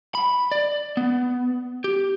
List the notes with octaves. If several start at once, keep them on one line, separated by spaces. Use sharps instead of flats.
B5
D5
B3
G4